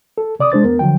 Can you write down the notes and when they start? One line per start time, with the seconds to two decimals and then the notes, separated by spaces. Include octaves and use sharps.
0.18 A4
0.40 C3 D5 D6 D#6
0.52 G#3 D4 C5 A6
0.64 E2 B3 A#4
0.79 D3 F3 F#3 G5